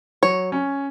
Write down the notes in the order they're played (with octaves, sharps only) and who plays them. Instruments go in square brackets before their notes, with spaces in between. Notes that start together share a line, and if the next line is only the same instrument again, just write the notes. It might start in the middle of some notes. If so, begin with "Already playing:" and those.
[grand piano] F#3 [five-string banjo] C#5
[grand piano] C#4